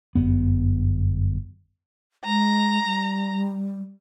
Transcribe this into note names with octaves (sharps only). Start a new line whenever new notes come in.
G1 F#2 B3
G#3 A#5
G3